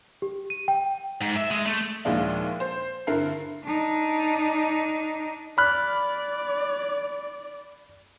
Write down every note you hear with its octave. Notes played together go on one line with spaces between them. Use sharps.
G4
D#7
G5
G#2
E5
G#3
A3
D#2 A#2 F3 G#3 D4 E4
C5
G2 D3 E4 A#4 C7
D4 D#4
D5 B5 F6 F#6